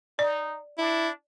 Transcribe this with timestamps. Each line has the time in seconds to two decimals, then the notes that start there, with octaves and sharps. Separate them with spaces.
0.19 D#4 D5
0.78 D4 E4